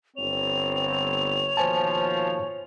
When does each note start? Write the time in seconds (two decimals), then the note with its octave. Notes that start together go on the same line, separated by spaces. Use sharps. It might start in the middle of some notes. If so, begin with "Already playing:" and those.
0.17 G1 C4 C#5 F7
1.57 D#2 B2 F3 C5 G#5 A5